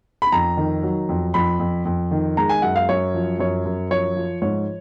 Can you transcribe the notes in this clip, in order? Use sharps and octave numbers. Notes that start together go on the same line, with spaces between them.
B5
F2 A#5
D#3
F#3
F2
F2 B5
F2
F2
D#3
G#3 A#5
G#5
F#2 F#5
F5
F#2 C#5
F3
F#2 C#5
F#2
F3 C#5
F3
G#2 C#5